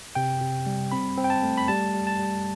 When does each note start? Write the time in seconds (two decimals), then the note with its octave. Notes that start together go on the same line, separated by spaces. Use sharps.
0.15 C3 G5
0.41 C3
0.66 G3
0.92 C4 B5
1.18 C4
1.24 G5
1.30 A5
1.43 A3
1.58 B5
1.68 G3 A5
1.94 G3
2.07 A5
2.19 G3